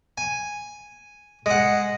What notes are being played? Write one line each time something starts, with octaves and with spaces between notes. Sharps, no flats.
G#5
G#3 F#5